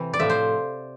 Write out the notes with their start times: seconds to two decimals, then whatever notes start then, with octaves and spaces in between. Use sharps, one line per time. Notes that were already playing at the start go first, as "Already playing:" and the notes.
Already playing: C3 E3
0.13 D5
0.19 A2 F3 A3 E5
0.30 C5